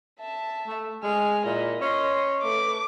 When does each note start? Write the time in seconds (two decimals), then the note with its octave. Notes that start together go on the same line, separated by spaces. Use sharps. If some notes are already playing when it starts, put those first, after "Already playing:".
0.19 E5 A5
0.67 A3
1.03 G#3 G#5 F6
1.45 A#2 E4 D#5
1.81 C#4 D#5 C6
2.43 A3 B4 D6